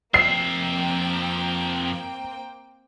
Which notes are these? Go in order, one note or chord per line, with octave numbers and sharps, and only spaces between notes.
F2 A#3 C4 E5 G5 C7